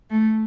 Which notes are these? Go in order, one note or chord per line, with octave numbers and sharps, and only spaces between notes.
A3